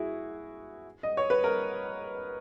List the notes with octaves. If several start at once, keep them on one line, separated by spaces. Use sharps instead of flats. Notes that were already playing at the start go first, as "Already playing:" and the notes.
Already playing: E4 F#4 G#4
D#5
C#5
B4
A#4